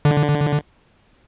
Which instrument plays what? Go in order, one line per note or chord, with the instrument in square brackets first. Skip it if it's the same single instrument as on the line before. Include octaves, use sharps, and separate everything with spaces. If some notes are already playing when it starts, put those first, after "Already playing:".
[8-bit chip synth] D3